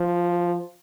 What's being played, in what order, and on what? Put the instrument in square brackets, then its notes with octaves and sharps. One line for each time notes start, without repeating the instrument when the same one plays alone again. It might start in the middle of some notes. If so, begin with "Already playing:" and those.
Already playing: [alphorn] F3